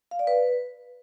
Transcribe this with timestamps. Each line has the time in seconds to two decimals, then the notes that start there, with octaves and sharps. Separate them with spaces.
0.11 F5
0.19 D5
0.27 B4